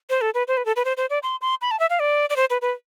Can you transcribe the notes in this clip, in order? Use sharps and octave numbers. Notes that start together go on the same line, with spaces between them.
C5
A4
B4
C5
B4
A4
B4
C5
C5
D5
C6
C6
B5
A5
E5
F5
D5
D5
C5
B4
B4